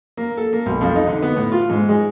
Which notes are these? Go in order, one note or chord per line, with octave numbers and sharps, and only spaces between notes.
A#3
A4
A#3
B1
F2
D#4
D3
B3
A2
F4
G#2
G#3